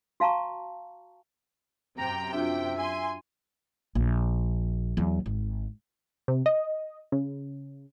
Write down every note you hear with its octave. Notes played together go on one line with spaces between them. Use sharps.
F#4 F5 A5 A#5 C#6
F#2 C3 G5 A#5 A#6
D4 F4 F#4 E5
G#5 C6 E6
A#1
E2 F#3
G#1
C3
D#5
C#3